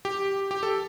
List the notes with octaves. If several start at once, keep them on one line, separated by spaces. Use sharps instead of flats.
G4
G4
A4